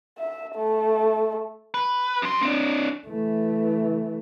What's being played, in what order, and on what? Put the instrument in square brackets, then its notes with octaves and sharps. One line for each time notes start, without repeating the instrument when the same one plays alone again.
[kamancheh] E5
A3
[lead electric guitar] B4
F#2 C6
C4 D4
[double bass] E3 A3